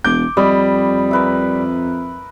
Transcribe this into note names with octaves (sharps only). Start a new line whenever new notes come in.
E1 D6 G6
F2 G3 D#5 B5
A#4 B4 E5